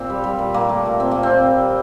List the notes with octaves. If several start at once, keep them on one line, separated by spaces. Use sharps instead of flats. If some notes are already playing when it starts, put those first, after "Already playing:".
Already playing: A#2 C4
G3
G3
A#2
A#2 A#3
A3
A3
A#2 C4
A#2 A#3
C4
A#2
G3
G3